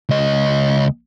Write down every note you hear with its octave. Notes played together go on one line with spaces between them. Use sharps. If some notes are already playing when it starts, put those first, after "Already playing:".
C#2 D#5